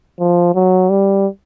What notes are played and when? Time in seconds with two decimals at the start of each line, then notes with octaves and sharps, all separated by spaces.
0.20 F3
0.55 F#3
0.90 G3